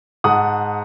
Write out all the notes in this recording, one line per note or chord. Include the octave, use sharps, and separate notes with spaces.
G#2 F#5 A5 D#6